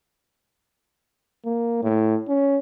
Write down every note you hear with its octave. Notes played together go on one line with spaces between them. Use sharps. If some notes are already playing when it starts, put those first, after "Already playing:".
A#3
A2
C#4